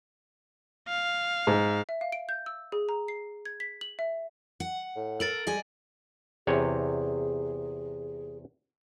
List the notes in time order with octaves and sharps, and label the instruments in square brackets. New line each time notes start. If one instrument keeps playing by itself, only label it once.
[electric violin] F5
[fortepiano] G#2
[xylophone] E5
F5
D7
G6
E6
G#4
A#5
C7
G#6
B6
F#7
E5
[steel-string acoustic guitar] F#5
[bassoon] A2
[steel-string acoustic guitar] A4 A#4 [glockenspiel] A6 D7 F#7
[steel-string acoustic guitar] G3 D#5 G#5 [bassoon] G#3
[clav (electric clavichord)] E2 C3 C#5 [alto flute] G#4